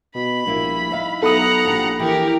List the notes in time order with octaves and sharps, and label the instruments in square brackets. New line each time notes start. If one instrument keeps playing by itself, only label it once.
[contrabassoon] B2 [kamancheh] B5
[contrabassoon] A#1 [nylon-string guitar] G3 A#3 E4
[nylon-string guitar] D#4 E5 F5
[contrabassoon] B1 [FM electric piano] A4 B5 D#6 [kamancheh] F#5 A#5
[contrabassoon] A#1 [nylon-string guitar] F3 D4 G4
[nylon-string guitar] E3 [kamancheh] G4 A#4